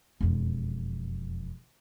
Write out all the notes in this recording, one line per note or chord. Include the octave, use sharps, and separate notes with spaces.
E1 F2